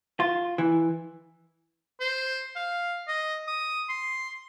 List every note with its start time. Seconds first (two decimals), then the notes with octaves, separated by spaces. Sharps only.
0.20 F4
0.58 E3
2.00 C5
2.56 F5
3.08 D#5
3.48 D#6
3.89 C6